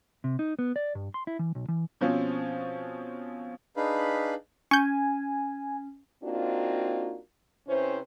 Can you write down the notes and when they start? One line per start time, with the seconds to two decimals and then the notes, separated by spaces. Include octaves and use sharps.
0.24 C3
0.39 D#4
0.59 B3
0.76 D5
0.95 G2
1.14 C6
1.27 E4
1.39 E3
1.55 B1
1.68 E3
2.01 B2 F3 C4 C#4
3.77 D4 D#4 G#4 B4 F5 B5
4.71 C#4 G#5 C#6 G6
6.23 A#3 C4 D4 D#4 F4 F#4
7.68 C3 C#4 E4 B4 C5